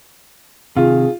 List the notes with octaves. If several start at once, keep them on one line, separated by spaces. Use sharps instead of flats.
C3 D#3 F4 G#4